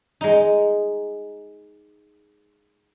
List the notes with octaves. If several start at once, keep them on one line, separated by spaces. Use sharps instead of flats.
G#3 D#4